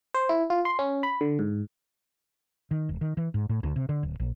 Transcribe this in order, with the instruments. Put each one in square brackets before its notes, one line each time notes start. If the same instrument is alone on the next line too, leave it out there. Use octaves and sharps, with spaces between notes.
[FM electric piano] C5
E4
F4
C6
C#4
B5
D3
G#2
[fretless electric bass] D#3
E1
D#3
E3
G#2
A2
D2
C3
D3
D1
A#1